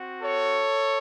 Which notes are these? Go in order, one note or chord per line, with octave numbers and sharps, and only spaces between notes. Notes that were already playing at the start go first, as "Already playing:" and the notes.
Already playing: C4 F#4
A4 C#5